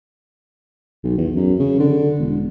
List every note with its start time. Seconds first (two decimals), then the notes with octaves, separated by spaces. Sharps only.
1.04 B1
1.18 E2
1.36 F#2
1.59 C#3
1.80 D3
2.19 E1